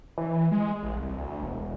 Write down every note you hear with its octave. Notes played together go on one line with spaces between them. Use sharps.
E3
G#3
A1
C2
D2
E1